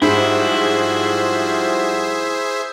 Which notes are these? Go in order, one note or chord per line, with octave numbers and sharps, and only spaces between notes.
G#2 F3 G3 E4 F#4 G#4 C5 E5